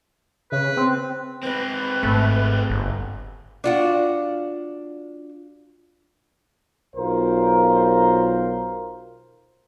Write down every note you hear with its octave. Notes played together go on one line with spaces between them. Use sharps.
C#3 B4
C4
G#3 C4 B4
G#1 A3
G1
D4 F4 F#4
B1 F4 A#4 C5